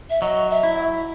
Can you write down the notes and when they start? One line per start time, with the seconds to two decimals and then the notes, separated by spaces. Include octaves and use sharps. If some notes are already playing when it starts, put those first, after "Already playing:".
0.10 E5
0.22 F#3 D#5
0.50 E5
0.63 E4